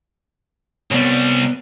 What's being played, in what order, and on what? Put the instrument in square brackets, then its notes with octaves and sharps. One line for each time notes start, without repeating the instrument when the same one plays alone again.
[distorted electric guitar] C2 G3 [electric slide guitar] B3 C#5